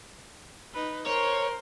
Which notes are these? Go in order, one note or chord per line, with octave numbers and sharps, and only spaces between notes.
D#4 B4
A#4 C5 C#5